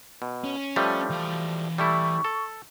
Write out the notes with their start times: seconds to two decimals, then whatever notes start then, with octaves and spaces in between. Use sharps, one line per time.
0.22 B2
0.44 C#4
0.76 F3 G3 A3
1.10 E3 F5
1.78 G3 A3 E4 C#6
2.25 A4